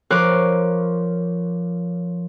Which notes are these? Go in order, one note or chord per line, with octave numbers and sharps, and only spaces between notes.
F3 A#4 C#5 C6 D6 F#6